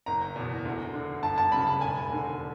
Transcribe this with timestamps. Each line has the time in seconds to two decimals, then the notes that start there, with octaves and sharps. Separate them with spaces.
0.06 F#1 A#5
0.36 E2 B2
0.65 D2
0.94 D3
1.23 G1 A5
1.38 A5
1.52 F#2 C#3 B5
1.67 A5
1.81 E1 G#5
2.10 D#2 D3